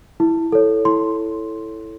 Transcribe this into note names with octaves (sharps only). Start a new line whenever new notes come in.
E4
A4 C#5
E4 C6